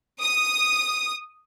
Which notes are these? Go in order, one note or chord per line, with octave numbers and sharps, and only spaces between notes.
D#6